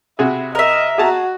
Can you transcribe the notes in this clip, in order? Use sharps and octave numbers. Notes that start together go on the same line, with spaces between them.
C3 E4 F#4 G#4
A#4 D#5 E5
F#4 G#4 A5 A#5